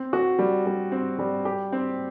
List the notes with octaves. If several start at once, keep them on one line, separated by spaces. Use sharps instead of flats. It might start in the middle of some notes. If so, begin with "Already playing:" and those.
Already playing: C4
F#4
G3
G3
C4
G3
G4
C4